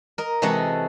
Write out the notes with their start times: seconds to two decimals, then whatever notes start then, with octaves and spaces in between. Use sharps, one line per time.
0.18 A#4 D#5
0.42 C3 E3 G#3 F#4 A4 D#5